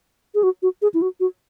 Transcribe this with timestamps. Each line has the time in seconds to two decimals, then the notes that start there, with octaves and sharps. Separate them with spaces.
0.35 G#4
0.43 F#4
0.62 F#4
0.82 G#4
0.94 E4
1.02 F#4
1.20 F#4